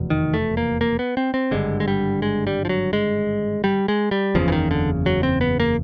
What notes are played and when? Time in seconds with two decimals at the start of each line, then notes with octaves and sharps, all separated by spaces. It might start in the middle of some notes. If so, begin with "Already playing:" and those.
Already playing: F1 E2 B2
0.10 D#3
0.34 A3
0.57 A#3
0.81 A#3
0.99 B3
1.17 C4
1.34 C4
1.51 G#1 G2 D3 G#3
1.80 G#3
1.88 G3
2.22 G#3
2.47 G3
2.65 F3
2.69 F#3
2.93 G#3
3.64 G3
3.88 G#3
4.11 G3
4.35 F#1 E2 C#3 F3
4.48 E3
4.52 D#3
4.71 D3
5.06 F#3
5.23 C4
5.41 B3
5.60 A#3